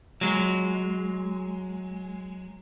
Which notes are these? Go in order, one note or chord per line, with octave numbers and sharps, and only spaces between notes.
F#3 G#3